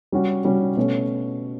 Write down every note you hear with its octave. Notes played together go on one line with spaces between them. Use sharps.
G3 C#4 F#4
G3 C#4 F#4
B2 A3 C#4